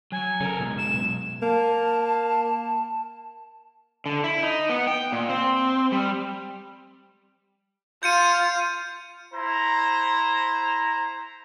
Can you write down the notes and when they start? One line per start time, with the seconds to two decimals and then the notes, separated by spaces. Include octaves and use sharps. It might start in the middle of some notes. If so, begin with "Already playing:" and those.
0.12 F#3 G#5
0.41 C#3 A4 A#4
0.60 F#2 B2 G#3
0.78 E7
0.94 B2
1.42 A#3 A5
4.06 D3
4.24 E4
4.43 D#4
4.69 B3
4.87 G5
5.12 A#2
5.29 C4
5.92 G3
8.03 F4 G6 C#7 D#7
9.34 E4 C5 A#5